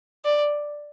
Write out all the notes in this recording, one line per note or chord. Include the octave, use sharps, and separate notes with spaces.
D5